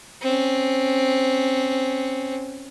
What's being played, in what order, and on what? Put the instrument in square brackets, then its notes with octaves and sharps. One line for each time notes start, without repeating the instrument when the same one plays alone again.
[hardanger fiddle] C4 C#4